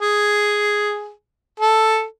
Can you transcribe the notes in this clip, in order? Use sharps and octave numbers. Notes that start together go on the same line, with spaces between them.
G#4
A4